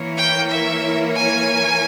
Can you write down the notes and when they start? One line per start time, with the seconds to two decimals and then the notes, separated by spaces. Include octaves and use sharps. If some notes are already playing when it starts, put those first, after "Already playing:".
Already playing: E3 A#3 E4 A#4 C#5
0.18 G5
0.52 E5
1.16 G#5